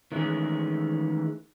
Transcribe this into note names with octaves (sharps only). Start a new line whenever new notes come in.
D#3 E3 G#3 A3 C#4 G#4